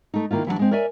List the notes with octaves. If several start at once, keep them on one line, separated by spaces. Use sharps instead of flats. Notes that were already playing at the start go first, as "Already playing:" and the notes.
A3 D#4
D#3 A#3 E4 F4
E3 F#3 A3 D4
G#3 C4
A#4 C#5 D5 E5 G#5